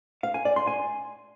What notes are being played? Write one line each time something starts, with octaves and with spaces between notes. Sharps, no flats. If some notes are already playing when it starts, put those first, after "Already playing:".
F5
G#5
D5
C6
G#5